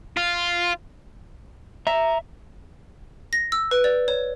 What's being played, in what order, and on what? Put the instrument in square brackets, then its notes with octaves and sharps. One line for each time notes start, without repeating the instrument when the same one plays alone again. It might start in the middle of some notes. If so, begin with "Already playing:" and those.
[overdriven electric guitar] F4
[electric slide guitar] E5 [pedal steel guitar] A#5
[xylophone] A#6
E6
B4
D5
C#5